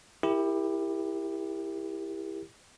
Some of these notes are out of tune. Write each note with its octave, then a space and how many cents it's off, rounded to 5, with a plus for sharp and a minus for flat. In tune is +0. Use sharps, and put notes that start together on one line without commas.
E4 +0 G4 +20 A#4 +0